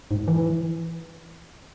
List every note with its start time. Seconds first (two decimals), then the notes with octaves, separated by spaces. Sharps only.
0.11 G#2
0.28 E3